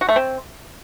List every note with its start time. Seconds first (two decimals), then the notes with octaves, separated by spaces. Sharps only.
0.01 F#4
0.09 A3
0.16 C4